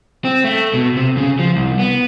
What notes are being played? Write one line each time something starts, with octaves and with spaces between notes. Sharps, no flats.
C4
A3
B2
C3
C#3
F3
C2
B3